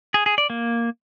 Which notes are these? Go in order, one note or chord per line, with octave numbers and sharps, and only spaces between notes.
G#4
G#4
D5
A#3